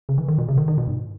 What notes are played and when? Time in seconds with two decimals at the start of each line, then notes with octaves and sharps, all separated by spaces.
0.09 C#3
0.18 E3
0.28 D#3
0.38 B2
0.48 C#3
0.57 D#3
0.68 D#3
0.78 B2
0.87 G#2